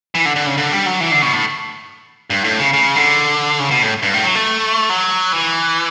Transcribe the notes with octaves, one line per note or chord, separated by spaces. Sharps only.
E3
D3
D3
C#3
D3
G3
F#3
E3
D3
B2
A2
G2
A2
C#3
C#3
D3
C#3
B2
A2
G2
A2
F#3
A3
F#3
E3